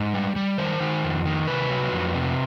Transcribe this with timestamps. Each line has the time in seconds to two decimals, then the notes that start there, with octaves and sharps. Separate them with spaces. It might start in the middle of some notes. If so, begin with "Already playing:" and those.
Already playing: G#2
0.14 G3
0.36 G3
0.58 D#3 C5
0.80 D#3
1.03 F2
1.25 D#3
1.47 C3 B4
1.70 F#3
1.92 F2
2.15 C3